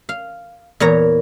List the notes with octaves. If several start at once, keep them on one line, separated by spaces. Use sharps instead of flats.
F5
E2 A#2 C#5 A#5